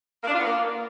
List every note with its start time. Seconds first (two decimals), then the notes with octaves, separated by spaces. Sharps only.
0.22 A#3
0.27 D4
0.33 F4
0.38 B3
0.44 A#3